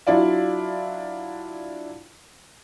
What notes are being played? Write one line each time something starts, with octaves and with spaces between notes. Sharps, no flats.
F#3 D4 E4 F4 D5 F5